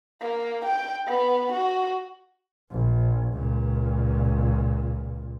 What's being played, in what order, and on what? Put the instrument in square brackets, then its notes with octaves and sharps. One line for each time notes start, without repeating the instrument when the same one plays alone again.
[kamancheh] A#3
G5
B3
F#4
[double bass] A#1
C#2 A#2